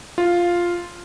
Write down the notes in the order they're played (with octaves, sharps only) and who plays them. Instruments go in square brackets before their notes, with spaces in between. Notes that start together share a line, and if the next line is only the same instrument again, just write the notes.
[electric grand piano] F4